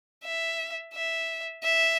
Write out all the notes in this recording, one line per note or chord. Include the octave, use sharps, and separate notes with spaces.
E5
E5
E5